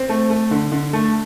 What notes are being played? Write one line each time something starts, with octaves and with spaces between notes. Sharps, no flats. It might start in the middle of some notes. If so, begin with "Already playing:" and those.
Already playing: C4
A3
A3
D3
D3
A3